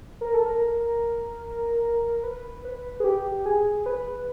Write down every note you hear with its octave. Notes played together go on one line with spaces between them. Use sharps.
A#4
A4
A#4
B4
B4
G#4
G4
G#4
B4